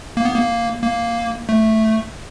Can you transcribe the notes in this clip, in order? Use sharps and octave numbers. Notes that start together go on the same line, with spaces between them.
A#3
B3
A#3
A#3
A3